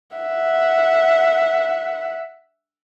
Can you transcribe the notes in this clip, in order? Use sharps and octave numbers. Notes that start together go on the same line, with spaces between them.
E5 F#5